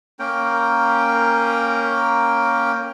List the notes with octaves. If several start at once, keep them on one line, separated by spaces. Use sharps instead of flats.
A#3 C#4 A#4 G5